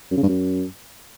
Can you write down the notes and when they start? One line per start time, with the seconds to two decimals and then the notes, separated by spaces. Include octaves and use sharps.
0.11 F#2
0.17 C#3
0.23 G2
0.29 F#2